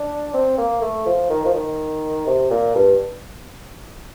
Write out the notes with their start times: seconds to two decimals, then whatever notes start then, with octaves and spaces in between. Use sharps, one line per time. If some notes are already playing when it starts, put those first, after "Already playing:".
Already playing: D4
0.34 C4
0.58 A#3
0.81 A3
1.06 F3
1.30 D#3
1.46 F3
1.54 D#3
2.27 C3
2.50 A#2
2.75 G2